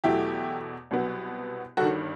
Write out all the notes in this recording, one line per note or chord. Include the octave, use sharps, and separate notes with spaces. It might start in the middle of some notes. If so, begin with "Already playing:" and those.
E2 B2 F#3 A3 E4 G4
C2 B2 F#3 B3
G1 G2 D#3 F#4 A4